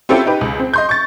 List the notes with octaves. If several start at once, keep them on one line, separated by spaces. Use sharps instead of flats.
C4 C#4 E4 F4 G4 A4
D#4 G4 B4
C#2
C4
D#5 C6 G6
C#6 A6